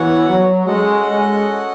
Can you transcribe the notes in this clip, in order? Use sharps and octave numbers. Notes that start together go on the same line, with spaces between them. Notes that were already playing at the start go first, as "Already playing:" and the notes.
Already playing: E3 B3 F#4 C#5 F#5
F#3
G#3 C#4 F#4 A4 D#5 F#5
G#3